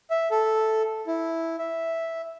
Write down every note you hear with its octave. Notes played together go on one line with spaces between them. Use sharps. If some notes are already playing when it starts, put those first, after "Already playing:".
E5
A4
E4
E5